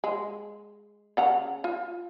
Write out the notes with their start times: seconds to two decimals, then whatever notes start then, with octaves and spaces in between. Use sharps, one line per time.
0.04 G#3
1.17 C#3 F#5 A#5
1.64 F4